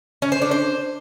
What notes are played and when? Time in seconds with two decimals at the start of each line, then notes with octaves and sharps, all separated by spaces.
0.22 C#4
0.32 C5
0.42 D4
0.51 C5